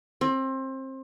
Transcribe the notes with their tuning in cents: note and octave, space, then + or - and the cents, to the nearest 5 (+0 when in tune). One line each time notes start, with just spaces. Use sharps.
C4 +25